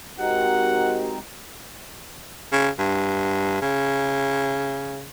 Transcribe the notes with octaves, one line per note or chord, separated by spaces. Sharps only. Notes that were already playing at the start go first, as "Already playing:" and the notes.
G#3 C4 D#4 F#4 G4 A#4 F#5
C#3
G2
C#3